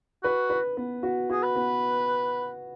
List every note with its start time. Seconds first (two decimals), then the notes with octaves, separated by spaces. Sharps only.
0.23 F#4 B4
0.50 B4
0.77 B3
1.03 F#4
1.30 F#4 G#4
1.43 B4
1.56 B3